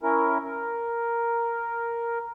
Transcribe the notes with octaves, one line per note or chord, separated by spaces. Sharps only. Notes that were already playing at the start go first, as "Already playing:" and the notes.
C#4 E4 A#4
A#4